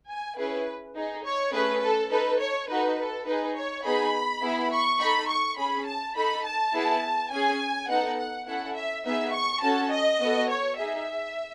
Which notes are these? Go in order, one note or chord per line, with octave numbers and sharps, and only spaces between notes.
G#5
C#4 E4 G#4 B4
D#4 G#4
C#5
A3 C#4 G#4 B4
A4
D#4 A4 B4
C#5
D#4 F#4 A4 B4
A4
D#4 G#4 B4
C#5
B3 D#4 G#4 B5
B3 E4 G#4
C#6
D#4 A4 B5
C#6
C#4 G#4 B5
A5
D#4 A4 B5
A5
B3 E4 G#4
C#4 G#4 G#5
B3 D#4 A4 F#5
F#5
C#4 E4 A4 F#5
E5
B3 D#4 G#4 E5
C#6
C#4 F#4 A4 A5
D#5
B3 F#4 A4
C#5
D#4 G#4 E5